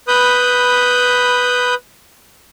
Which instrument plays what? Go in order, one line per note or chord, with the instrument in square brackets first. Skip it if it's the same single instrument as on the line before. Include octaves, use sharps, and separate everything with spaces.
[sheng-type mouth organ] B4 B5 D#6 G6